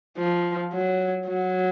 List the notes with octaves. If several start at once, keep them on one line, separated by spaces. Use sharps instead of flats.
F3
F#3
F#3